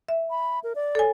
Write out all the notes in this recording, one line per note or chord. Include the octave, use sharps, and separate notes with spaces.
E5
B5
A#4
D5
A4 C#5 G#5